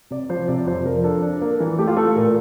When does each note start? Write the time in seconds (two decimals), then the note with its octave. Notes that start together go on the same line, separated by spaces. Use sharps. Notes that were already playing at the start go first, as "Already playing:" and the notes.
0.11 C3 D5
0.30 F3 C5
0.48 C3 D5
0.66 F2 C5
0.86 F3 A#4
1.04 D4 A4
1.22 D4
1.41 A#3
1.60 E3
1.78 A3 G4
1.87 F4
1.97 A3 A4
2.15 A#2 A#4